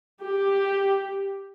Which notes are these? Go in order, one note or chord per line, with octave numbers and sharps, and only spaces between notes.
G4